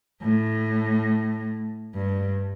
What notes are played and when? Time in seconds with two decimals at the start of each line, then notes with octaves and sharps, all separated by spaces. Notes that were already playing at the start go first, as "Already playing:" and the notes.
0.22 A2
1.95 G2